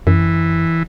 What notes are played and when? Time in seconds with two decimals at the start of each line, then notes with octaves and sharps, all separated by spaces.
0.07 F#2 E3